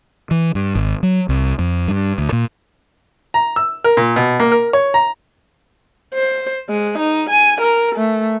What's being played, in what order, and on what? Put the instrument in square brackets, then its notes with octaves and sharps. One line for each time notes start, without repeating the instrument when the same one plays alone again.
[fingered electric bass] E3
G2
G#1
F#3
C2
F2
G2
D2
A#2
[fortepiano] A#5
E6
A#4
A#2
B2
A#3
A#4
C#5
A#5
[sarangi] C5
G#3
D#4
G#5
A#4
A3